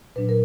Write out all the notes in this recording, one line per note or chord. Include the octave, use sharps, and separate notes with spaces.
A#2 F#3 D4 B4
A#4